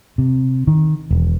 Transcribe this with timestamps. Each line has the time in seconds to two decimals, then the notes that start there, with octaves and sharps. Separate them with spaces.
0.18 C3
0.67 D#3
1.11 E1